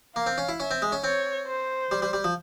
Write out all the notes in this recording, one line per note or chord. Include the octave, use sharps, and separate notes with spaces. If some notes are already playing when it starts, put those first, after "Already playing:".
A#3 F5
C4
C#4
E4
C#4 E5
C4
G#3
C#4
C4 C#5
C5
G3
G3
G3
F3